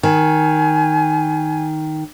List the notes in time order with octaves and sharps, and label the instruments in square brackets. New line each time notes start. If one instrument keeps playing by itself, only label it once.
[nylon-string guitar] D#3 [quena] G#5